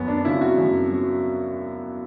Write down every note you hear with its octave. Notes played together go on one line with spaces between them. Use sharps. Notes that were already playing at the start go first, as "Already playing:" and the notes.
Already playing: F#2 B3
D4
C#3 F#3 E4
F#4
F#2
F#3